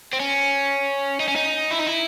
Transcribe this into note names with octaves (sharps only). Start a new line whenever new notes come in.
C4
C#4
D#4
C#4
D#4
E4
D#4
E4